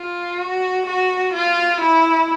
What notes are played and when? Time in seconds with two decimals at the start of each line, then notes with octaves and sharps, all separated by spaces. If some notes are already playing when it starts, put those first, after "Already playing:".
Already playing: F4
0.39 F#4
0.86 F#4
1.34 F4
1.81 E4